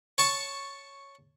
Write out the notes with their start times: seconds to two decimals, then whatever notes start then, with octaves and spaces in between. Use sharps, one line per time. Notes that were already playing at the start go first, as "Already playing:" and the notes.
0.18 C#5 A5 C#6